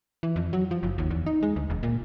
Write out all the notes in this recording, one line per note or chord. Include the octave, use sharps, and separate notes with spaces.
E3
F2
F#3
F3
F#1
D#2
E2
D#4
G#3
D2
E1
A#2